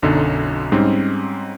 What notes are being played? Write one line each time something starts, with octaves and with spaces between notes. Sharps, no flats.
B1 F#2 D3 D#4
G#2 G3 C4 C#4 D#4